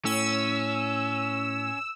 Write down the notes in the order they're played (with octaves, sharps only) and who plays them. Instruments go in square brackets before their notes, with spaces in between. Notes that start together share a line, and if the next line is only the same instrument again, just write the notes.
[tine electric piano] A2 [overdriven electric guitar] C#4 [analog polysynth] E6